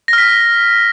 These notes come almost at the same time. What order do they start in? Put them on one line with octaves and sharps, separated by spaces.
A#6 F6 B6